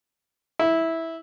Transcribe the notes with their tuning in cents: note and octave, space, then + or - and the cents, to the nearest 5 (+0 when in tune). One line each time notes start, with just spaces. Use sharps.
E4 -10